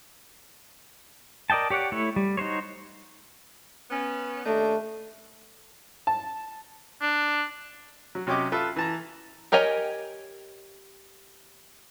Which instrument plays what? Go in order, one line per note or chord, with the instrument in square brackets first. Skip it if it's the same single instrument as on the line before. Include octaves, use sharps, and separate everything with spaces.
[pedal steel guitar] A#4 D5 D#5 G5 A5
G4 C#5 D5 F#5
A3 E4 C#5
G3
D#4 F#4 C5 C#5
[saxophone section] B3 C#4
[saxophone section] D#2 D4 D#4 [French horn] A3
[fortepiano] A5
[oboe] D4
[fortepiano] F#3
C3 F#3 C#4 G4 D#5 D6
F4 A4 B4 E5
E3 A5 A#5
[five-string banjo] G4 A#4 C#5 D#5 G#5